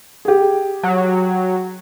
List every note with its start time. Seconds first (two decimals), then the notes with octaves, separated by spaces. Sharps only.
0.25 G4 G#4
0.83 F#3